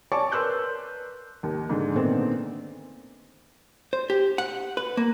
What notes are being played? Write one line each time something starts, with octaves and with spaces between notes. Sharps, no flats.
C#5 D5 G#5 A5 C#6 D6
A#4 B4 C6 E6 F#6 G6
D#2
G#2 D3
A#2 D3 D#3 A3 B3 C4
C5
G4
F#5
B4
A#3